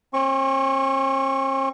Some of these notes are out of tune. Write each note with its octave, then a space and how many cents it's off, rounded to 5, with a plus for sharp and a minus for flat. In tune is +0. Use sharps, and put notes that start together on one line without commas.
C4 +45 C#6 -5